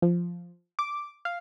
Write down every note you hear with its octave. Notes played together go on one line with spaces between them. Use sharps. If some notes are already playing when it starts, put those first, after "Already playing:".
F3
D6
F5